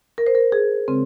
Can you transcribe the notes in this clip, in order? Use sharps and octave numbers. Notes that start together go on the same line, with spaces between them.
A#4
C5
A#4
G#4
C#3 G#3 C4